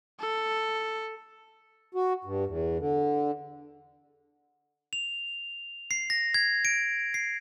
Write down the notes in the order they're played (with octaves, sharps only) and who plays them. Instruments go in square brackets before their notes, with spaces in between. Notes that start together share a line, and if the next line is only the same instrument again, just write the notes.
[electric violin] A4
[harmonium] F#4
G2
E2
D3
[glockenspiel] F7
C7
A#6
G#6
D7
C7